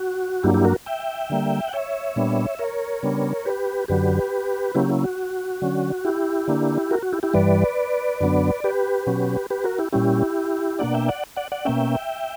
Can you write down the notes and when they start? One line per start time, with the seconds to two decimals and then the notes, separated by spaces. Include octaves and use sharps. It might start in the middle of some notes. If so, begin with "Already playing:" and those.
Already playing: F#4
0.43 G2 F#3 A#3 D4 E4 G4
0.54 E4 G4
0.65 F#4 A#4
0.86 E5 G5
1.30 D3 G3 A#3
1.68 F#5
1.73 C#5 E5
2.16 A#2 G3 B3 D4
2.59 A#4 C#5
3.03 C#3 G3 B3 D4
3.45 G4 B4
3.88 F#2 D3 F#3 G4 B4
4.75 C#3 F#3 A#3 C#4 E4 G4
4.89 E4
5.04 F#4
5.62 D3 F#3 C#4
6.05 E4 G4
6.48 D3 A#3 D4
6.91 F#4 A#4
7.02 F#4
7.13 E4 G4
7.23 E4 G4
7.34 G2 E3 G3 B4 D5
8.21 F#2 D3 F#3 B3 D4
8.64 G4 B4
9.07 B2 F#3 C#4
9.50 G4 B4
9.64 F#4 A#4
9.79 E4 G4
9.93 A#2 G3 C#4 E4 G4
10.79 B2 A#3 D4 D5 F#5
10.94 E5 G5
11.08 D5 F#5
11.36 D5 F#5
11.52 D5 F#5
11.65 B2 A#3 C#4 E5 G5